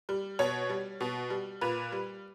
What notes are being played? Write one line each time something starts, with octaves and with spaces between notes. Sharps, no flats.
G3
B2 C#5
G3
B2
G3
A#2 B4
G3